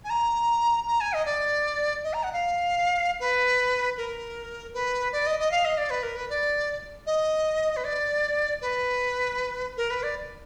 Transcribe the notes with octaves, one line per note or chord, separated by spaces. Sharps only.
G#5
A#5
A#5
G#5
D#5
D5
D#5
A#5
F#5
F5
B4
A#4
B4
D5
D#5
D#5
F5
D#5
D5
B4
A#4
B4
D5
D#5
B4
D5
B4
A#4
B4
D5